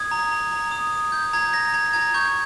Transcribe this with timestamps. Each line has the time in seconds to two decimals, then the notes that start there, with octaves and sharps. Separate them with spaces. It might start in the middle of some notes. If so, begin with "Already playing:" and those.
Already playing: D#6 G#6
0.11 A#5
0.31 A#5
0.51 A#5
0.72 D#6
0.92 D#6
1.12 G6
1.33 A#5 G#6
1.53 A#5 A#6
1.68 A#6
1.73 A#5 G#6
1.93 A#5 G#6
2.14 C#6 G6